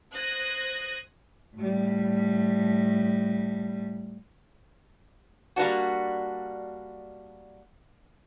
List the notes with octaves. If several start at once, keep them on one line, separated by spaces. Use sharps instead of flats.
C5 D#6 F#6 G#6 A#6
A2 G3
G3 A#3 D4 F#4